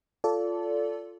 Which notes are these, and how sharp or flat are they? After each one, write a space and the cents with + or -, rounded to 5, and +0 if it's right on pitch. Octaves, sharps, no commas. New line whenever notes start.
F4 +0 A4 +0 D5 -25